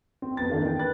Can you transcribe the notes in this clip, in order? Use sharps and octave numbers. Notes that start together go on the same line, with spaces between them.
C4
F2 B3 A6
D#3 E3 A#3 D4 D#4
G5
B4 F#6 A6